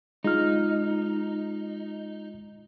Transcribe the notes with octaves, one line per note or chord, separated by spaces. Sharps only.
G#3 D#4 F4 F6